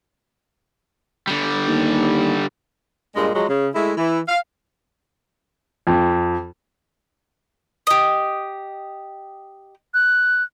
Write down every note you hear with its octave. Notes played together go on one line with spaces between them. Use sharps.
D3 G3
D#2
G2 A#2 G#3
F3 F#3 G#3
C#3
G#3 A3 E4
E3
F5
F2
G4 D#5
F#6